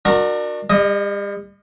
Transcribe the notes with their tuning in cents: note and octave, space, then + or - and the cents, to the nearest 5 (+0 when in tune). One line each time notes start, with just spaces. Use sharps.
D4 +30 F#4 -15 A#4 +0
G3 +45 D#5 +0